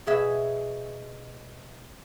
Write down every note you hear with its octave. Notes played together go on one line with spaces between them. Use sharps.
B2 G#4 E5